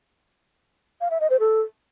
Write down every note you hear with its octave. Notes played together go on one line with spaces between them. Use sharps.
F5
E5
D#5
C5
A4